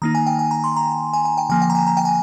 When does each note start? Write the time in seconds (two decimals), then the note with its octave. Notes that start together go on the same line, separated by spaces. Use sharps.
0.02 D#3 A#3 D#4 A#5
0.15 G#5
0.27 G5
0.39 G#5
0.51 A#5
0.64 C6
0.76 A#5
1.13 G#5
1.25 G#5
1.38 G5
1.49 D3 F3 A#3 G#5
1.62 G5
1.70 A#5
1.75 G#5
1.87 A#5
1.97 G5
2.05 G#5